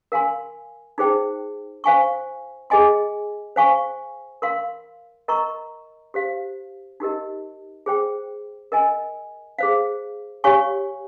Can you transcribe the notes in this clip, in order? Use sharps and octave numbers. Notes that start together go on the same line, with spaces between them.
A#4 F5 G#5 C6
D#4 G#4 C5 G5
C5 F5 G#5 C#6
G#4 D#5 G#5 C6
C5 F5 G#5 C#6
A#4 F5 C6
A#4 D#5 A#5 C#6
G4 C5 F5
D#4 G4 A#4 D#5
G#4 C5 G5
A#4 D#5 G#5
G#4 C5 F5
G4 C#5 F5 G#5 C#6